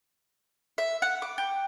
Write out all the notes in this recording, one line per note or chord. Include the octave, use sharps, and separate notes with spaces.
E5
F#5
D6
G5